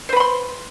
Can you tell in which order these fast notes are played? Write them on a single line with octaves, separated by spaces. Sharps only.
C5 B4 B5 C6